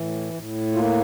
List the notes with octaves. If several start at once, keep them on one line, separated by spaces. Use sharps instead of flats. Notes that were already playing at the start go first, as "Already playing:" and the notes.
Already playing: A2 E3
A2
A#3 F4